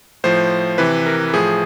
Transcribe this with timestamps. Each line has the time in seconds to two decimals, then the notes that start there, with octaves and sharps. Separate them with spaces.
0.24 A2 F3 C5
0.78 C3 E3 B4
1.06 A#4
1.34 A2 F3 G#4